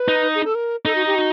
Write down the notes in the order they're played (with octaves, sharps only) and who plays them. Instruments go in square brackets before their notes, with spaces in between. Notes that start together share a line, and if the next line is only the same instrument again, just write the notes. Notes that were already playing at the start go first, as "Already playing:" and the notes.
Already playing: [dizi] B4
[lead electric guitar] D#4
[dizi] G#4
A4
A#4
[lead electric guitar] D#4 [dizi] A4
[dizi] F#4
G4
F#4